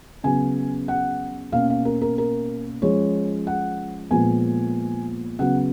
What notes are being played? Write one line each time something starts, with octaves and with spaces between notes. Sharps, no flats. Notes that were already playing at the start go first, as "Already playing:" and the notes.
C#3 F#3 B3 G#5
F#5
B2 A#3 C#4 F5
F5
A#4
A#4
A#4
F3 G#3 C#4 C#5
F#5
A#2 F3 G#3 B3 G#5
C#3 F#3 B3 F#5